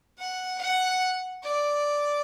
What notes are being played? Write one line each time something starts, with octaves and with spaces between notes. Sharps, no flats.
F#5
F#5
D5